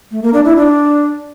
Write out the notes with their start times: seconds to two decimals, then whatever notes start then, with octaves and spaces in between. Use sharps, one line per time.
0.11 A3
0.22 A#3
0.34 D4
0.45 E4
0.56 D4